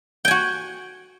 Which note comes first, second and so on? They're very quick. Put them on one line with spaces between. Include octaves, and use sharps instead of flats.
G5 G#5 F#4